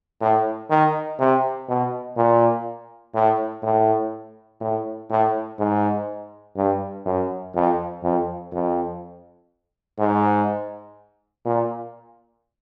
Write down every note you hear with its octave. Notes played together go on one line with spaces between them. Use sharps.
A2
D#3
C3
B2
A#2
A2
A2
A2
A2
G#2
G2
F#2
F2
F2
F2
G#2
A#2